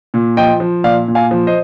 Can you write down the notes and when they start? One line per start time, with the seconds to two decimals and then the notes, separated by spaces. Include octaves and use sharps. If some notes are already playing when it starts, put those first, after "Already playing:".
0.14 A#2
0.37 F3 D#5 G5
0.60 F3
0.84 A#2 D5 F5
1.08 A#2
1.15 F5 G#5
1.31 F3
1.47 C5 D#5